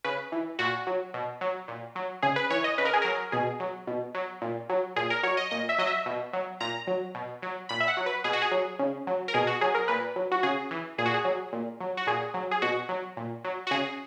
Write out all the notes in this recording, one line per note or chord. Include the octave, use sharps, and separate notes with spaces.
C#3 B4
E3
A#2 F#4
F#3
B2
F#3
A#2
F#3
C#3 G#4
B4
E3 C#5
D#5
C#3 B4
A#4
G#4
F#3 A#4
B2 G#4
F#3
B2
F#3
A#2
F#3
A#2 G#4
A#4
F#3 C#5
D#5
A#2 D#5
E5
F#3 D#5
E5
B2
F#3
A#2 A#5
F#3
B2
F#3
A#2 B5
E5
F#5
F#3
B4
B2 G#4
F#4
G#4
F#3
C#3
F#3
A#4
B2 G#4
F#4
F#3 G#4
A#4
A#2 B4
F#3
F#4
C#3 G#4
E3
A#2 G#4
F#4
G#4
F#3
A#2
F#3
F#4
A#2 G#4
F#3
G#4
B2 F#4
F#3
A#2
F#3
F#4
C#3 G#4